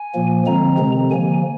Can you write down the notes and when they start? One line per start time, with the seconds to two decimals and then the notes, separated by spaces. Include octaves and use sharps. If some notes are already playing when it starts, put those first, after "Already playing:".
Already playing: G#5
0.14 A#2 F3 A#3
0.46 D3 F3 G#3 C4 A#5
0.78 C3 D#3 G#3 C4
1.11 D3 F3 A#3 G#5